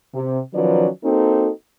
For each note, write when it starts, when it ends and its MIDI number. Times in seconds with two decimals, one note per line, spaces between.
0.14 0.39 48
0.54 0.87 51
0.54 0.87 53
0.54 0.87 54
0.54 0.87 61
0.54 0.87 71
0.54 0.87 74
1.04 1.50 58
1.04 1.50 60
1.04 1.50 63
1.04 1.50 66
1.04 1.50 69